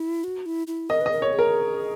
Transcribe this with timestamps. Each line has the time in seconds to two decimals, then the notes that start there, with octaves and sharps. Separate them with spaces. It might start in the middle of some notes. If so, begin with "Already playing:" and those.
Already playing: E4
0.24 F#4
0.46 E4
0.67 E4
0.89 A#4 D#5
1.01 B4 D#5
1.11 A#4
1.22 C#5
1.33 G#4
1.39 A#4